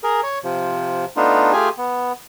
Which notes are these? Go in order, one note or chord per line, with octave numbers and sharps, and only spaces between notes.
G#4 A#4
C#5
C3 F3
A3 B3 D4 D#4 F4
A3 F4 G4 G#4 G#5
B3